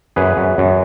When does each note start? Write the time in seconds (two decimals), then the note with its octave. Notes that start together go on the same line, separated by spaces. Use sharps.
0.16 F#2 G#4 B4
0.37 F#2
0.58 F#2